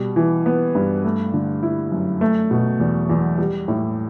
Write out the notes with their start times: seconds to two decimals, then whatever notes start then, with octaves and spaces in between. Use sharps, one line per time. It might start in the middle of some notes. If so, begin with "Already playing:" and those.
Already playing: B2 G3
0.16 E3
0.46 B3
0.75 G2
1.04 A3
1.34 D3
1.63 E4
1.92 F#2
2.21 A3
2.51 B2
2.80 E2
3.10 E2
3.38 G3
3.68 A2